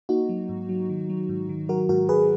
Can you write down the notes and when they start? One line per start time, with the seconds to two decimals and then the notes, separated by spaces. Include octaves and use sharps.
0.09 A#3 D#4 F#4
0.29 F#3
0.49 G#2
0.69 F#3
0.90 D#3
1.09 F#3
1.29 G#2
1.49 D#3
1.69 F#3 F#4 A#4
1.89 G#2 F#4 A#4
2.09 G#2 G#4 B4